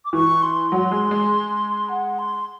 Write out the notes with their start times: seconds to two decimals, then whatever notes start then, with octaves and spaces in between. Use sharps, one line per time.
0.05 D6
0.13 E3 C#6
0.42 C6
0.72 F#3
0.91 G#3
1.11 G#3
1.89 F#5
2.19 C6